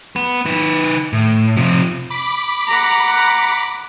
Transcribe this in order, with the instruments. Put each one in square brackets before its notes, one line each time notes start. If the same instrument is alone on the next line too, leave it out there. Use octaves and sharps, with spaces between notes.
[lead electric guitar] B3 B4
D#3 B4
A2
C3 F3
[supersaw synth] B5 D6 B6
[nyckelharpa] F#5 A#5